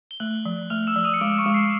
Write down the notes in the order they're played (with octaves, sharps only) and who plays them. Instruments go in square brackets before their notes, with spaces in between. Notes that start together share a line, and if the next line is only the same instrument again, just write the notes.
[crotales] G7
[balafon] A3 [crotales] F#6 F#7
[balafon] F3
[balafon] A3 [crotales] F6 F7
[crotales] E6 E7
[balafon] F3
[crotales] D#6 D#7
C#7
[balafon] G#3 [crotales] D6 D7
[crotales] C#6 C#7
[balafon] G#3
[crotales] C7